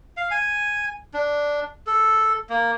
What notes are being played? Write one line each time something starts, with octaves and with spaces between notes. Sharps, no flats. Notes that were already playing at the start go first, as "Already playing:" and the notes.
F5
G#5
D4
A4
A#3